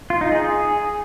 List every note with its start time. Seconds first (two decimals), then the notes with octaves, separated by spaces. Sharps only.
0.10 F4
0.21 D#4
0.32 G#4